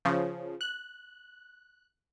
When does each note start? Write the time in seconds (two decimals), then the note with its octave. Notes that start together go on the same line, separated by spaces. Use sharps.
0.05 C#3 F3
0.61 F#6